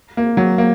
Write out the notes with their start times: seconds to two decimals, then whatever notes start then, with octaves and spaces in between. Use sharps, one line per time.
0.17 A#3
0.37 F#3
0.58 A#3